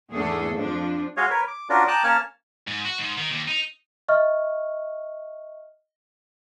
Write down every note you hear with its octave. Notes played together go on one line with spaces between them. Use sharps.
E2 G#2 A3 D4 G#4 A4
F2 F3 D4
G#3 F#4 C#5 D#5 F5
A#4 B4 C#5
D6
C#4 D4 F4 F#4 A#4 D5
G5 A5 A#5 D6 D#6 F#6
A#3 C#4 C#5 A5 F6
G#2
F#4
G#2
D#3
D#2
D#4
D#5 E5 C#6 F6